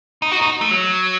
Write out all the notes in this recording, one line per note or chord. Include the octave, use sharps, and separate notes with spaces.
D#4
F#4
D#4
A3
F#3